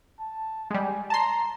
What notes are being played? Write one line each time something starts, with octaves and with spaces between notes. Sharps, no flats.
A5
G3 G#3 G#5
A5 A#5 C6